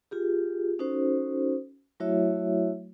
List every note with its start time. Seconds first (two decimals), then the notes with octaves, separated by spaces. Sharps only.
0.11 F4 G4 G#4
0.79 C#4 D#4 F#4 A4 C5
2.00 F#3 A3 E4 F#4 C#5 E5